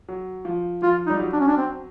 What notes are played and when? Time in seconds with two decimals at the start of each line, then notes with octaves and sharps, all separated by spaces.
0.09 F#3
0.45 F3
0.82 F3 F4
1.07 D#4
1.10 G3
1.20 F#3
1.33 D4
1.40 C#4
1.48 D4
1.57 C4